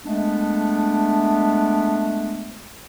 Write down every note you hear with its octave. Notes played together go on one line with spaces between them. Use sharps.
G#3 A3 B3 D4